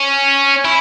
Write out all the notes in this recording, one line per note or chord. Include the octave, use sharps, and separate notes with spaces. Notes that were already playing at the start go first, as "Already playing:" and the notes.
Already playing: C#4
E4